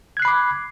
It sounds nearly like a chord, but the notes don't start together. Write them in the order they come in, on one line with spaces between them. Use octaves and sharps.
G#6 F#6 C7 B5 D6